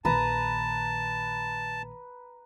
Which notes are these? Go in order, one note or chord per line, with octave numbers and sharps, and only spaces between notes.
A#1 D#3 B4 A5 A#5